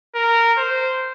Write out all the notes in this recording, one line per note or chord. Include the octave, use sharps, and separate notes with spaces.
A#4
C5